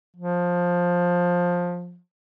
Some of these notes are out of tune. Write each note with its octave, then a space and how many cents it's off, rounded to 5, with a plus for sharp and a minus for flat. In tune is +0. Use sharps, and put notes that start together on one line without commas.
F3 +15